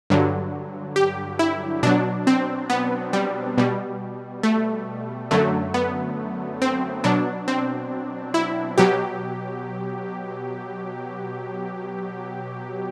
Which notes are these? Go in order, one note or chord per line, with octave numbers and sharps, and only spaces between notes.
G2 D3 F#3
G4
E4
B2 F#3 D4
C4
B3
G3
B2 G3
A3
F#2 D3 F#3 A3
B3
C4
B2 F#3 D4
C4
E4
B2 F#3 G4